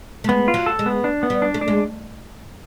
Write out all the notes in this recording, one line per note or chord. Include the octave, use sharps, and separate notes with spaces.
A3
G#3 B3
F4
F#3
A4
G#3
B3
D4
B3
G3
D4
A3
D4
G#3